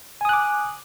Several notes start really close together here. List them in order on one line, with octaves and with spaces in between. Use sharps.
G#5 D#6 F#6 D6